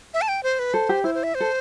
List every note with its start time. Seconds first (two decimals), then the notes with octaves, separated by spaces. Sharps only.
0.14 E5
0.22 A5
0.28 G5
0.43 C5
0.59 B4
0.74 A4 C5
0.89 G4
1.04 E4 C5
1.15 C5
1.23 E5
1.35 C5
1.40 A4